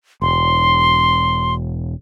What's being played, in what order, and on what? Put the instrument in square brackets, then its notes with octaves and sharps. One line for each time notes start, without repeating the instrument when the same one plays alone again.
[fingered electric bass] E1 [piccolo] C6